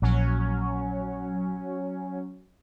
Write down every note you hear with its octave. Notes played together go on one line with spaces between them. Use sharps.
A#1 F#3 C#4